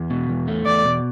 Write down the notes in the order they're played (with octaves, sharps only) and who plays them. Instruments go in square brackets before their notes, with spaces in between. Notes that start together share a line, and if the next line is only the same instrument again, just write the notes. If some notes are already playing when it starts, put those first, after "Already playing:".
Already playing: [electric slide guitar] E2
B2
E2
A3
[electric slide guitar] E2 [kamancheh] D5
[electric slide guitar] B2